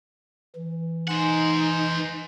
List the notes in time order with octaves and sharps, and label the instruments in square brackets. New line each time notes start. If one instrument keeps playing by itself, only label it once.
[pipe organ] E3
[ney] D#4 [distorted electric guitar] C5 F#5 [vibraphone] G#5 C6